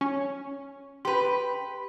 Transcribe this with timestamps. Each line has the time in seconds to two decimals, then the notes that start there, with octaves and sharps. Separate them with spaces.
0.01 C#4
1.05 G4 B4 B5 C6